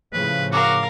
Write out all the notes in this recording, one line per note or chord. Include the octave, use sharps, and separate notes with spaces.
A2 C#3 F3 B4
F#4 A#4 F5 D6